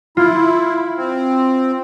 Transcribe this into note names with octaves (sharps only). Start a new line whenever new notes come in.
E4 F4
C4